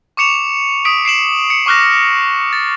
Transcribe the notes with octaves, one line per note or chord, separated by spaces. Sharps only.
C#6 D6 C#7 E7 F7
D#6 B6 D7
C7 D7 E7 F#7
C#7
C#6 D6 F6 F#6 A#6
A6